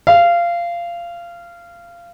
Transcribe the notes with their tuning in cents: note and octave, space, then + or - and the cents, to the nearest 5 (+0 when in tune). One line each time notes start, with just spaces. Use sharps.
F5 -20